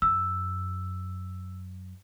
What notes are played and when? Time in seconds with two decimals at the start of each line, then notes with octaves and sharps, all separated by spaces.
0.02 F#2 E6